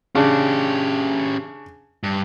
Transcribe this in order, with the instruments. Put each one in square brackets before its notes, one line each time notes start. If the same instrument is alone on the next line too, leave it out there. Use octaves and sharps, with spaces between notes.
[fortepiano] C#3 D4 [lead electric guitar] C#4 G4
[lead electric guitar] G2